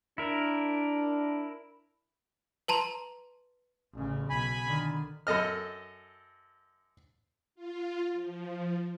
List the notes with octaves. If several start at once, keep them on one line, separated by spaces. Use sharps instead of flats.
D4 E4 A#4
B4 A5 A#5 C6
A1 C#3
B1 G#5 B5
D3 D#3
F#2 A4 D#5 F6
F4
F3